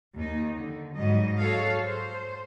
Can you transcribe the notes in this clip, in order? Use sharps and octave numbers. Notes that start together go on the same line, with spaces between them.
D#2 D#4
D3
G#2 F#3 G3 D#5
F#4 G#4 A4 C#5 F5
C5